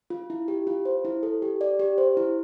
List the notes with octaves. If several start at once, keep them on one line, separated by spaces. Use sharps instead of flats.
F4
E4
G4
F4
C5
E4
A4
G4
D5
G4
C5
E4